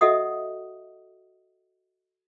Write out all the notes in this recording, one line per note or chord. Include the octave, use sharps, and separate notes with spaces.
F#4 A4 D#5 E5 F#5 D#6